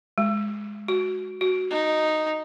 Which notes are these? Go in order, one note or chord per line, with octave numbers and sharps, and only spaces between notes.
G#3
F#4
F#4
D#4